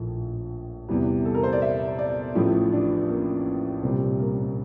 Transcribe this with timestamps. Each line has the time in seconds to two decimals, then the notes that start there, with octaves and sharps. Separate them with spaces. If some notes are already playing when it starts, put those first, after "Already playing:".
Already playing: A#1 A2 F3
0.88 E2 C3 E3 G3
1.25 A4
1.34 A#4
1.43 C5
1.53 D5
1.62 E5
1.99 D5
2.35 A1 A2 F3 E4
2.72 D4
3.09 A#3
3.83 C2 A#2 G3 C4
4.19 A#3